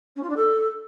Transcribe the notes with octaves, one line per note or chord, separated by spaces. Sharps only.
C#4
F4
D4
A4